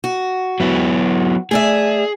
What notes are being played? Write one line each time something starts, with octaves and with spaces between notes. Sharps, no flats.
F#4
F#3 B3 E4
A3 G#4 D5 E5